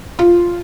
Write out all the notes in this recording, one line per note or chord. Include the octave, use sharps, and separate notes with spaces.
F4